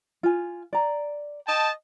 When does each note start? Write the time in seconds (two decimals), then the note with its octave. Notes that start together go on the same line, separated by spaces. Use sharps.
0.23 F4 G#5
0.73 D5 A#5
1.47 D#5 G5 A5